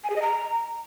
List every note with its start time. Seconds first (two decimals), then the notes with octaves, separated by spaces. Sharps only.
0.04 G#5
0.10 G#4
0.16 D#5
0.22 A#5